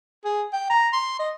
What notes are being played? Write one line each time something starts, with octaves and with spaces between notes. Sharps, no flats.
G#4
G5
A#5
C6
D#5